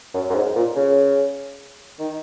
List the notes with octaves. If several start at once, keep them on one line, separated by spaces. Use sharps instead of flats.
F#2
F#2
G#2
A#2
C#3
D#3